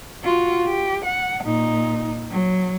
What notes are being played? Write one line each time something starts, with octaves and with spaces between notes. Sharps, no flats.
F4 F#4
G4
F#5
A#2 D#4
F#3